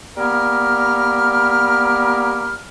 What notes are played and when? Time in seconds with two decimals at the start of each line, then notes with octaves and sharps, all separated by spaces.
0.17 G3 A#3 B3 A#4 B5 F6